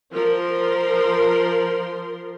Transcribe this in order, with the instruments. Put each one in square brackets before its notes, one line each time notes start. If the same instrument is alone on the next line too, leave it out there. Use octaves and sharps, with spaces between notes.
[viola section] F3 A#4 C6